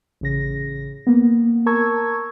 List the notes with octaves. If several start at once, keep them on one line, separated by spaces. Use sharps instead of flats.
A1 C#3 A#6
A#3 B3
A#4 A5 A#5 C#6 E6 G#6